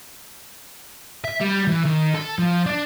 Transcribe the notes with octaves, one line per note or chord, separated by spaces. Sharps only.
E5
G3
E3
D#3
A4
F3
D4